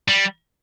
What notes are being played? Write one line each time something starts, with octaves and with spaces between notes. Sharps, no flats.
G3